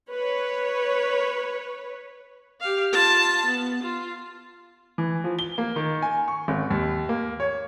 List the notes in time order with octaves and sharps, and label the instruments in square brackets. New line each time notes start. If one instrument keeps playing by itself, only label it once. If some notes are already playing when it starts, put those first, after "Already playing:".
[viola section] B4 C#5
[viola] G4 F5
F4 A5
B3
F4
[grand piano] E3
F3
G7
A#3
D#3
G#5
C#6
G#1
D#2
A#3
C#5